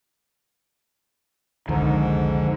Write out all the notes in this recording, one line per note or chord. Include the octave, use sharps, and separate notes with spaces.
C2 F2 G#2 D3 D#3